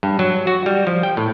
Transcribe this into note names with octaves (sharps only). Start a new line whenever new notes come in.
G2
F#3
F#4
G3
F3
G5
A2